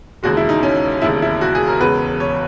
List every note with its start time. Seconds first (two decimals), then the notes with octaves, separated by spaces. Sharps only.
0.23 E1 D#2 C#3 G#3 F#4
0.37 E4
0.49 D#4
0.63 C#4
1.02 E1 D#2 C#3 E4
1.22 E4
1.41 F#4
1.55 G#4
1.68 A#4
1.81 E1 E2 C#3 G#3 B4
2.20 C#5